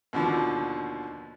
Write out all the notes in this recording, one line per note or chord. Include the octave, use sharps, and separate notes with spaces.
D#2 B2 D3 F3